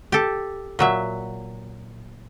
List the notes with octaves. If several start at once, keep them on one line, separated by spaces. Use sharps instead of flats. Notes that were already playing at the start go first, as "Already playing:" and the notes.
G4 A4
A#2 F#3 E5